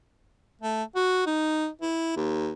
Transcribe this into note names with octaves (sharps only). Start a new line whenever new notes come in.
A3
F#4
D#4
E4
D#2